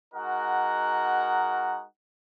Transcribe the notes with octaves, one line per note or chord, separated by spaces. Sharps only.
G#3 D#4 F#4 A#4 F#5